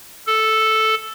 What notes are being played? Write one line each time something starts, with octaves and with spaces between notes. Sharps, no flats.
A4